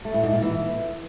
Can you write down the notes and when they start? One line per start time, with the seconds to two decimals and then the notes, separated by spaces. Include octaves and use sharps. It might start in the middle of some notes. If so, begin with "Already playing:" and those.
0.05 A3
0.14 A2
0.24 G#2
0.33 A#2
0.42 E3